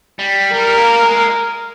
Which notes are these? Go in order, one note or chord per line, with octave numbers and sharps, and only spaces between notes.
G3
G3 A#4
A#3
G#3